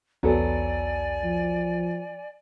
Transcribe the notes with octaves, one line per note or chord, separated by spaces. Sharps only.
B1 E2 F#3 B3 A4 D5 G#5
F3